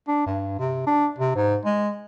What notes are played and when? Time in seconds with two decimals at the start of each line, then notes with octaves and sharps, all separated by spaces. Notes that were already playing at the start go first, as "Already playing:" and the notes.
0.08 D4
0.26 G2
0.59 C3
0.87 D4
1.19 C3
1.35 G#2
1.65 G#3